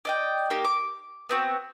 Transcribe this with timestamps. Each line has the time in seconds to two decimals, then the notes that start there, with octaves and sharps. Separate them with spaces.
0.05 D5 D#5 G5
0.50 A#3 D#4 G4 A#4
0.65 D6
1.29 B3 C4 F#4